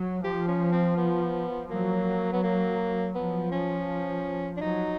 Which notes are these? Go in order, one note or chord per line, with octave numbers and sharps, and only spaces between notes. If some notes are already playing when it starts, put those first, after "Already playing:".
Already playing: F#3
F3 G4
C#4
C4
B3
F#3 A#3
B3
A#3
F3 B3
C#4
D4
F#3 D#4